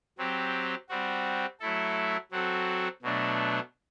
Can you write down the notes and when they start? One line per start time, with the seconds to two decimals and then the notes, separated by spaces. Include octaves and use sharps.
0.18 F#3 C4 G4
0.89 G3 C4 F#4
1.60 F#3 A3 E4 A4
2.31 F#3 C4 F#4 A4
3.02 B2 F#3 A3 D4